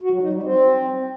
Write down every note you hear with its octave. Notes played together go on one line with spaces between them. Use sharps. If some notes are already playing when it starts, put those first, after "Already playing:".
F#4
F#3
D#4
G3
C4